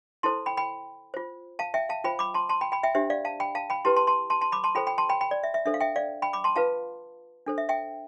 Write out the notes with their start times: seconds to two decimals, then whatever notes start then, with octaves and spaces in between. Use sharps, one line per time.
0.23 E4 A4 C5 A5 C6
0.46 G5 B5
0.57 G5 B5
1.14 F4 C5
1.59 F5 A5
1.74 E5 G5
1.89 F5 A5
2.04 F4 C5 G5 B5
2.19 B5 D6
2.34 A5 C6
2.49 A5 C6
2.61 G5 B5
2.72 G5 B5
2.83 E5 G5
2.95 D4 G4 C5 E5
3.10 D5 F5
3.25 F5 A5
3.40 G5 B5
3.55 F5 A5
3.70 G5 B5
3.85 E4 G4 B4 A5 C6
3.96 A5 C6
4.07 A5 C6
4.30 A5 C6
4.41 A5 C6
4.52 B5 D6
4.64 A5 C6
4.75 F4 A4 C5 G5 B5
4.87 G5 B5
4.98 A5 C6
5.09 G5 B5
5.21 G5 B5
5.31 D5
5.43 E5
5.54 E5
5.66 D4 A4 C5 E5
5.74 F5
5.80 E5 G5
5.96 D5 F5
6.22 G5 B5
6.33 B5 D6
6.44 A5 C6
6.56 F4 B4 F5 A5
7.46 D4 A4 C5
7.58 E5
7.69 E5 G5